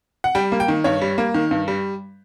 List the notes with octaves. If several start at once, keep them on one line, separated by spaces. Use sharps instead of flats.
F#5
G3 G5
A#3
G5
D#3
G2 C#5
G3
A#3
D#3
G2
G3